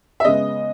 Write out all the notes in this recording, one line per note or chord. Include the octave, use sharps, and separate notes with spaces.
E5
C#3 G#3 B3 D#5